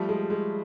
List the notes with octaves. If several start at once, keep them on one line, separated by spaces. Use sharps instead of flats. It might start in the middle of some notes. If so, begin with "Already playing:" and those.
Already playing: F3 G3 A3
G#3
G#3